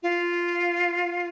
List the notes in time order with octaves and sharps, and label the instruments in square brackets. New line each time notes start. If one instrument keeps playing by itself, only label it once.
[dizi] F4